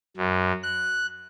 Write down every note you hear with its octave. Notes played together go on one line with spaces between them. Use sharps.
F#2
F#6